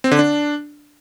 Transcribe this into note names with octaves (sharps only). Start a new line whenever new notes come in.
C4
D3
D4